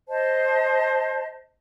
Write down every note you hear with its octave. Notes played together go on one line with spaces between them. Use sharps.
C5 D#5 A5